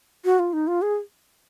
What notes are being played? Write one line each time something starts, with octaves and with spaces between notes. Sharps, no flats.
F#4
F4
D#4
F4
G#4